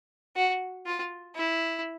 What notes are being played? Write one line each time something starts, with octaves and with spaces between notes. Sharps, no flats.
F#4
F4
E4